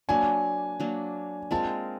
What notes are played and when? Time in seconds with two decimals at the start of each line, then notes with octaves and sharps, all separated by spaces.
0.09 F#3 A#3 D4 G#5
0.80 F#3 A#3 D4
1.51 G#3 C4 F4 A#4 A5